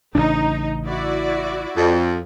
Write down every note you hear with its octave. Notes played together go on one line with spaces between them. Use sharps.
A1 C#3 D4 D#4
E4 F#4 D5
F2